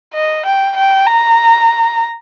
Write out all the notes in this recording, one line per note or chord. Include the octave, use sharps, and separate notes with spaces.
D#5
G5
G5
A#5